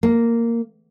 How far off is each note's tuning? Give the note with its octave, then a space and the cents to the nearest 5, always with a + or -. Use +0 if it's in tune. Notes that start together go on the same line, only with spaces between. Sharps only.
A#3 -10